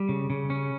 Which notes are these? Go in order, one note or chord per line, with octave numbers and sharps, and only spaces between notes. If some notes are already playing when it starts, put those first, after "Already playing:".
Already playing: G3
C#3
C#3
C#4